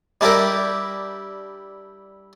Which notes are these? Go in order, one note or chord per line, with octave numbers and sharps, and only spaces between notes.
G3 D4 E4 G4 A#4